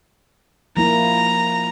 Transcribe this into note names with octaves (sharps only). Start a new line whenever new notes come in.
F3 A#3 E4 A#5